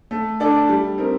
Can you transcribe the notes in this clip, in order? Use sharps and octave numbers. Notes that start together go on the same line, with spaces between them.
A3
D4 A4 D5
G3
C4 D#4 A#4